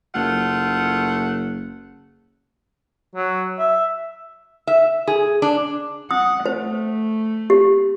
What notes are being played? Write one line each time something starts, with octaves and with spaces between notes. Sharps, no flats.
F#1 A3 F4 F#5
F#3
E5
E5
G#4
D4
F#5 D#6
A3 C5
G4